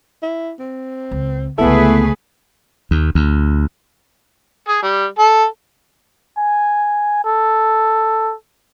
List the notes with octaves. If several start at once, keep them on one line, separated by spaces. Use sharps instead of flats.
E4
C4
C#2
C#2 D3 A3 B3 E4 G#4 A4 B4
D#2
D2
G#4
G3
A4
G#5
A4